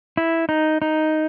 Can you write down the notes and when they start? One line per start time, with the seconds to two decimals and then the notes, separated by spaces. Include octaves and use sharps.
0.17 E4
0.49 D#4
0.82 D#4